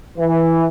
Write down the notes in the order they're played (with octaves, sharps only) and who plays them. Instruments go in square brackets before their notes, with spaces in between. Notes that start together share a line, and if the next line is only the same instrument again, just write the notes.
[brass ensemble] E3